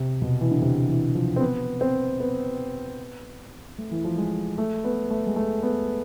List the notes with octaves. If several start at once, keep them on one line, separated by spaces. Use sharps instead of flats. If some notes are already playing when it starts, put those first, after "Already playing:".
Already playing: C3
B2
E3
D3
C3
E3
F3
C4
B3
C4
B3
A3
E3
F3
G#3
A3
B3
A3
G#3
A3
B3